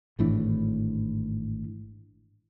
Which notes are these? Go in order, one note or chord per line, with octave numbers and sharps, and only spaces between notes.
G#1 A2 E3 D4